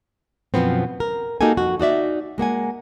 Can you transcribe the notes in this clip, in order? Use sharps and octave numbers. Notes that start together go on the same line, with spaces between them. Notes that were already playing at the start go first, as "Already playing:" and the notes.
F#2 B2 F3 B3 C4
A#4
A#3 D#4 F#4 G4 A4 G#5
F2 F#4
D#4 F#4 D5 E5
G#3 A#3 F#5 G#5